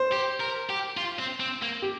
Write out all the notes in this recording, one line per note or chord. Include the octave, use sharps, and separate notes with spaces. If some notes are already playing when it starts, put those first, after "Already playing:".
Already playing: C5
G4
A#4
G4
F4
C4
C4
A#3
G4